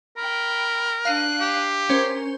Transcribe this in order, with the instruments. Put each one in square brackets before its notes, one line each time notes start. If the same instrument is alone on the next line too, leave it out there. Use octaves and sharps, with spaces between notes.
[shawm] A#4 [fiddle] G5 B5
[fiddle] D4 F#6 [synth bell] F5 C7 D#7
[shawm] G4
[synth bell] C#4 C5 [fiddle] A#4